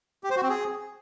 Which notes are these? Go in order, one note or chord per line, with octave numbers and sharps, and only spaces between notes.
G4
C5
F#4
C4
G#4